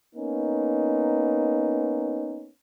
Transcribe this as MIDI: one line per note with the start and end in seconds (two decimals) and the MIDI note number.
0.14 2.48 58
0.14 2.48 59
0.14 2.48 61
0.14 2.48 63